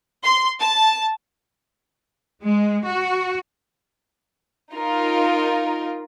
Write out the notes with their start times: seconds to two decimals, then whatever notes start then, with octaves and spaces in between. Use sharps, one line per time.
0.23 C6
0.60 A5
2.42 G#3
2.85 F#4
4.73 D#4 F4 A#4